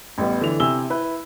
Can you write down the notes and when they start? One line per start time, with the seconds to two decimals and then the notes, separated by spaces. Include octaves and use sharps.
0.18 A1 G3 B3
0.41 D3 E3 F7
0.60 C3 E4 G#5 E6 G7
0.90 E4 B4